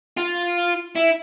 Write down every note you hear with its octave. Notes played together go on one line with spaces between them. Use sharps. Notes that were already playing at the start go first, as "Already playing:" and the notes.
F4
E4